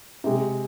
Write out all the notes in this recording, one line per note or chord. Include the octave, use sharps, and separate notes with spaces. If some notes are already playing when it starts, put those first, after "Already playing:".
C3 G#3